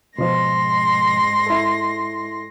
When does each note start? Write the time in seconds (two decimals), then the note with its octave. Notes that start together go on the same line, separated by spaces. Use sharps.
0.18 G#2 B2 F3 C6 A#6
1.46 E4 A4